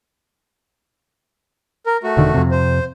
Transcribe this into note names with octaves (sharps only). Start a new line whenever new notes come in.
A#4
A3 F#4
E1 D3 D#3
F2 C3
C5